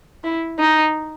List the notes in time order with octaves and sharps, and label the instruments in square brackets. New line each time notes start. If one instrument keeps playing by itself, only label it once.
[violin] E4
D#4